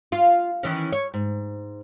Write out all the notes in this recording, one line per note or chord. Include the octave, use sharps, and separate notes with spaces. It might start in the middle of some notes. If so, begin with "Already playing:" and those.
F4
D#3 E3 C#4
C#5
G#2